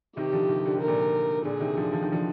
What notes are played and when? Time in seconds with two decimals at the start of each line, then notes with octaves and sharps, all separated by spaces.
0.17 C3 D#3 G4
0.33 D3 F3
0.49 C3 D#3
0.66 D3
0.77 D#3 A#4
0.87 A#2 D3
1.45 A#2 D3 G#4
1.60 C3 D#3
1.77 D3 F3
1.93 F3
2.03 D#3
2.12 D3 F3